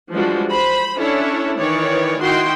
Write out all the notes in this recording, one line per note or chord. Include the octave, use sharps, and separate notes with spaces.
E3 F3 G3 G#3 D4 F#4
C5 B5
C#4 D4 E4 A4 C#5
D#3 E3 C#5 D5
D#3 D#4 E4 F#4 G5 C6